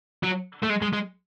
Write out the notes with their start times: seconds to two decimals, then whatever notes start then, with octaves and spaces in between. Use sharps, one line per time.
0.23 F#3
0.63 A3
0.69 G#3
0.82 G#3
0.93 G#3